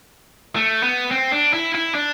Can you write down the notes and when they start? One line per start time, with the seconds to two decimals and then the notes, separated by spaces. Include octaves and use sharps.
0.56 A3
0.83 B3
1.11 C4
1.32 D4
1.53 E4
1.75 E4
1.95 D4